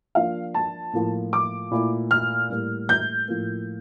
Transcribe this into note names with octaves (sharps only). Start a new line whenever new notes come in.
F3 A#3 D4 F4 F5
A5
A2 F3 A#3 F4
D6
A#2 A3 E4
F6
A2 G3 A#3
G6
A2 F3 A#3